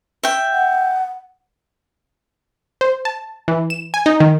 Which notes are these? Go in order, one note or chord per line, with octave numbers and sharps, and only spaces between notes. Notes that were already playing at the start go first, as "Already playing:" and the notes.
E5 G5
F#5
C5
A5
E3
E7
G#5
D#4
D#3